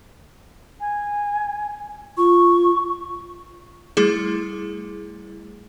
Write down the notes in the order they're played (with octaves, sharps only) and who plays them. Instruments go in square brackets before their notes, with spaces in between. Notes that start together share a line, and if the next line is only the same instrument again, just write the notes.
[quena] G#5
[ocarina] F4 [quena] C#6
[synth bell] G3 A3 E4 G#4